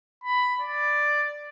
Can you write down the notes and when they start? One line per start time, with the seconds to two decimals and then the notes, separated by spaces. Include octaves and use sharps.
0.24 B5
0.61 D5